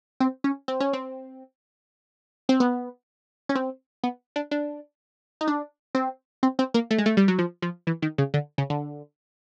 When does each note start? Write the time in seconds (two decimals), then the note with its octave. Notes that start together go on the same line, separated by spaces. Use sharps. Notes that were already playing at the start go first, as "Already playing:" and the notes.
0.20 C4
0.44 C#4
0.68 C4
0.80 C#4
0.93 C4
2.49 C4
2.60 B3
3.49 C#4
3.55 C4
4.03 B3
4.36 D4
4.51 D4
5.41 D#4
5.48 D4
5.95 C4
6.43 C4
6.59 C4
6.74 A#3
6.91 A3
6.98 G#3
7.06 A3
7.17 G3
7.28 F#3
7.38 F3
7.62 F3
7.87 E3
8.02 D#3
8.18 C#3
8.34 D3
8.58 C#3
8.70 D3